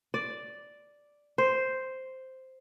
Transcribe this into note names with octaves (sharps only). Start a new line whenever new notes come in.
D5
C5